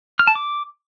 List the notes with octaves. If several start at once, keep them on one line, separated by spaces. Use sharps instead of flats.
F6
A5
D6